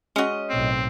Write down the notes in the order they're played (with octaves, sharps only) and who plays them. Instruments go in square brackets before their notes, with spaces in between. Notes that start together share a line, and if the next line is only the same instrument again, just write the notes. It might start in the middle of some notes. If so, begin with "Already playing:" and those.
[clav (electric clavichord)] G#3 F#4 [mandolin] C#4 D#5
[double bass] B1 A2 [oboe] C4